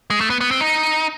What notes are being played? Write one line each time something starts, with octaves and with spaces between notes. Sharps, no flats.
G#3
A3
B3
B3
C4
D#4